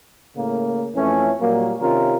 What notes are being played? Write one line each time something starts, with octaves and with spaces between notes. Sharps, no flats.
A2 C#3 A#3
F2 E3 A3 C#4
A#2 F#3 G3 A#3
C3 D#3 C#4 F4 A#4